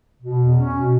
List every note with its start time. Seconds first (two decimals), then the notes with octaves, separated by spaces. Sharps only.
0.21 B2
0.39 E2
0.56 C#4
0.74 B2